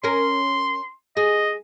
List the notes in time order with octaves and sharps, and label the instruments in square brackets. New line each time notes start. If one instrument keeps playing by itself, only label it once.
[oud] C#4 A#4 [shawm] C6
[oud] G#4 [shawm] D#5